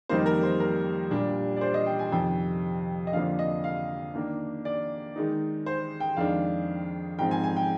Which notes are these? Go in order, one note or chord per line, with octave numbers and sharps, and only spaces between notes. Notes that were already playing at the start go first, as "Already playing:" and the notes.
F2 D#3 G3 A#3 D#4 C5
A#4
C5
A#4
A#2 G3 D4
D5
C5
D#5
G5
G#5
F2 C3 D#3 G5
D#5
F2 D3 F3 A#3 D4 F5
D#5
F5
D#3 A#3 D4
D5
D#3 G#3 D#4
C5
G5
F2 D#3 G#3 D4 F5
G#2 F3 C4 G5
G#5
G#5
G5